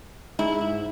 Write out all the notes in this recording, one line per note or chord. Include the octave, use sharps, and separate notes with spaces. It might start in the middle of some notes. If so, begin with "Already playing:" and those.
G#2 E4